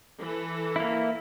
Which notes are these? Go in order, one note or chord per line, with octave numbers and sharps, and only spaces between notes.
E3 A4
A#3 E4